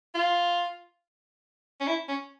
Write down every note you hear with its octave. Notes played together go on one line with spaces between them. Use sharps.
F4
C#4
E4
C#4